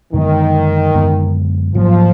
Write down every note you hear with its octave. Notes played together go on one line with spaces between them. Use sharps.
F#2 D3 D#3 G#3 B3
F#2 D3 G#3 B3
G#2 F3 F#3 A#3